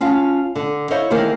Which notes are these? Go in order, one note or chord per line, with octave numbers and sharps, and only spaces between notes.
C#4 F4 F5 A5
D3
E4 C5 C#5 D#5 F5
D#3 E3 A#3 C4 G#4 C5